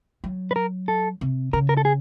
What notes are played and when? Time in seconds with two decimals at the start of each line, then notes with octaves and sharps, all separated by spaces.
0.24 F#3
0.51 B4
0.56 A#4
0.88 A4
1.21 C3
1.53 C#3 A#4
1.69 A#4
1.77 A4
1.85 G#4